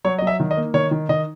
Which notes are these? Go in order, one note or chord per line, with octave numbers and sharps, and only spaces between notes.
F#3 C#5
F#3 D#5
E5
D#3
D#5
A#3
D#3 C#5
D#3
D#3 D#5